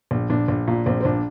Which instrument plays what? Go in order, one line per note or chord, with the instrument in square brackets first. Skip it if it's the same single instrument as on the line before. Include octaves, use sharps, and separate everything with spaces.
[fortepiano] A#1
A#1 D4
A#1
A#2
A#1 C4
C4
A#1 D4